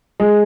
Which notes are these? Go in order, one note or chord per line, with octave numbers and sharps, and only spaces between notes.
G#3